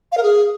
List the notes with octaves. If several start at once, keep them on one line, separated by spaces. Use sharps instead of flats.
F5
A#4
G#4